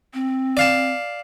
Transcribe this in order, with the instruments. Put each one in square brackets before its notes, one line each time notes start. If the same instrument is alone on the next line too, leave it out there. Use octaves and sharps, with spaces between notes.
[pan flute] C4
[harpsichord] D5 F5 A5